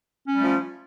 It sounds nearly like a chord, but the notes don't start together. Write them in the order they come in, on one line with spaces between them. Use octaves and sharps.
C#4 G3 A3 F3